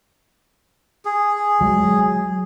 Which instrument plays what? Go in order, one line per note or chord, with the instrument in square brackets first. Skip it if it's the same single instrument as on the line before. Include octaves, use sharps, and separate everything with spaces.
[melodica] G#4
[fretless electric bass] F#3 G#3